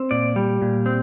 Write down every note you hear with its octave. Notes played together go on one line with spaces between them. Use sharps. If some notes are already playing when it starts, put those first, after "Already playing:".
Already playing: C4
A#2 D5
G3
A#2
C4